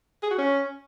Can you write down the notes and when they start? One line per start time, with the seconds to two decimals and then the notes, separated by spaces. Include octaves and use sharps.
0.23 G#4
0.31 F#4
0.39 C#4